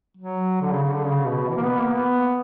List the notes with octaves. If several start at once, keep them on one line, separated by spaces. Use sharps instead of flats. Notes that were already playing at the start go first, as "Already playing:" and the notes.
F#3
D3
C#3
C#3
D3
C#3
B2
E3
A#3
B3
A#3
B3